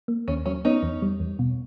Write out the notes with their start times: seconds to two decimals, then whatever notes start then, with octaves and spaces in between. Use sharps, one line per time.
0.08 A#3
0.28 D#2 C#4
0.46 F#3 C#4
0.65 B3 C#4 D#4
0.83 E2
1.02 G3
1.20 E2
1.39 B2